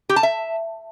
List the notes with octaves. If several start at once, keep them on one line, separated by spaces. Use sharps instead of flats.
G4
A5
E5